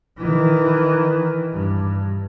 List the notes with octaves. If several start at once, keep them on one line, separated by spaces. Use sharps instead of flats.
D#3 E3
G2